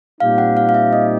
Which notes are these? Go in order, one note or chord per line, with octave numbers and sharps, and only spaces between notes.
A#2 G3 C4 D#4 G4 F5
F#5
F5
F5
E5
D#5